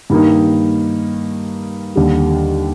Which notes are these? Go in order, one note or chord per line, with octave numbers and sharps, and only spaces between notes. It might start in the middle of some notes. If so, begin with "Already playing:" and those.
G2 D#3 A#3 D#4
D#2 D3 G3